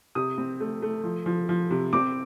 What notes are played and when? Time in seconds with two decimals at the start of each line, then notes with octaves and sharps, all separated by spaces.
0.15 C3 D#6
0.38 C4
0.60 A3
0.82 A3
1.03 F3
1.26 F3
1.49 F3
1.70 C3
1.93 C4 D6